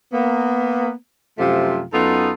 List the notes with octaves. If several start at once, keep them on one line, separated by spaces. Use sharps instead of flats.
A#3 B3
F#2 C3 F3 A3 F4
F#2 B3 D#4 F4 A4